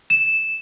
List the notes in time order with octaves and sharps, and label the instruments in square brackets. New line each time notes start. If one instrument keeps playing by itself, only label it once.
[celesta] E7